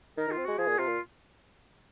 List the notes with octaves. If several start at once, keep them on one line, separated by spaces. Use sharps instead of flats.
D#3 A#4
D#3 F4
C4
G#3 F#4
F3 G#4
A#2
C3 F4
A#2